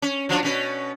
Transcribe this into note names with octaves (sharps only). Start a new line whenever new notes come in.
C#4
F3 F#3 D4
B2 C#4 B4